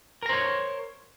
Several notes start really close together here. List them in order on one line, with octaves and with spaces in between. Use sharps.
A#4 A#5 C5 C#5